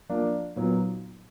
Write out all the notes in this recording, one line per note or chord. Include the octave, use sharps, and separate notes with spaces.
F3 A#3 D4
A#2 F#3 B3 D#4